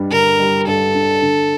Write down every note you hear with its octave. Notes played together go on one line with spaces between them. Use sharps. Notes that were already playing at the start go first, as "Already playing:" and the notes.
Already playing: G2 G3 D4
D3 A#4
G3
G2 A4
D4
D3